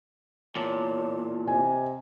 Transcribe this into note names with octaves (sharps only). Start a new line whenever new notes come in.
E2 A#2 C#5 A5
C3 D#5 G#5